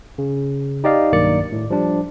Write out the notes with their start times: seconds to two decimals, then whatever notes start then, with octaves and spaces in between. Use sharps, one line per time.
0.18 C#3
0.84 D#4 G4 D5 D#5 F5
1.12 B1 G2 D#3 A#3 D5 C#7
1.52 A2
1.70 F3 G3 D4